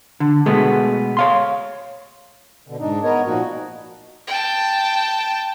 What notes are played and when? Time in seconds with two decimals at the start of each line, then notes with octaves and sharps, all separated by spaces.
0.20 D3
0.46 B2 G#3 A3 B3
1.17 C#5 F5 C6
2.68 B2 D3
2.79 G#2 D4 D#4
3.03 B3 A#4 C#5 D#5
3.26 A#2 F3 A#3 D#4 F#4
4.28 G5 A5